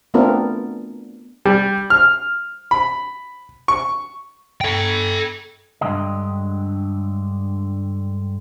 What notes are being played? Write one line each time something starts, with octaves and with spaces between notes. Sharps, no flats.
A3 B3 C4 D4 F4 A#4
G3
F6
B5
C#6
A4 G5
G2 D3 D#3 G#3 G4 D#5